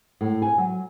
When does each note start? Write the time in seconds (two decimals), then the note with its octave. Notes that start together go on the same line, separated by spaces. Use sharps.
0.21 A2
0.42 G#5
0.58 F#3